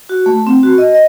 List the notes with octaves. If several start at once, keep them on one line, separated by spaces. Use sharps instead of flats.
F#4
A3
C4
F#4
D#5
D#5